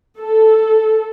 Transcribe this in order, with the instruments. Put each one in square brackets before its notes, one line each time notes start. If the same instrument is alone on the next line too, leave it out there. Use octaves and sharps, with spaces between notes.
[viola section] A4